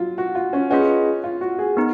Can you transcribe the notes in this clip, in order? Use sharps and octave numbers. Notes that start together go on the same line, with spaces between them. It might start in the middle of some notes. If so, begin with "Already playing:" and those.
Already playing: F#3 F4
F#4
F4
C#4
C#4 F4 G#4 B4 D#5 F#5
F4
F#4
G#4
B3 D#4 A#4